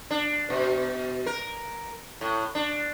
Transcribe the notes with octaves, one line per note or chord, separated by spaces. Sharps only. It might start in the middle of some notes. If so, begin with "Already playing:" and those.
D4
B2
A#4
A2
D4